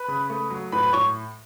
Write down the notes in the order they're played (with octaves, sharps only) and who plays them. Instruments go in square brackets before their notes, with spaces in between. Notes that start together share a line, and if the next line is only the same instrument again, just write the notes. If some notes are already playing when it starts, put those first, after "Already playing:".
Already playing: [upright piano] B4 B5
C#3
A3
F#3
A2 B4 B5
B4 B5
A2 C#5 C#6